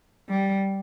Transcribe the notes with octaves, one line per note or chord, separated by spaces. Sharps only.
G3